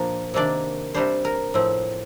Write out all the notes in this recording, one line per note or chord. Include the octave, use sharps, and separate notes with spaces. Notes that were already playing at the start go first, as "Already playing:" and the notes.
Already playing: A#2 F3 A#3 D4 A#4
C3 D#3 A#3 D4 D5
C3 G3 D4 C5
A#4
A2 F3 C4